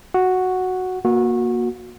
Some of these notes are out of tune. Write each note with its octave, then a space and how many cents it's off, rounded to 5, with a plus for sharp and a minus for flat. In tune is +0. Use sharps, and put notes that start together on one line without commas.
F#4 +0 F#5 +0
A#3 +15 F#4 -20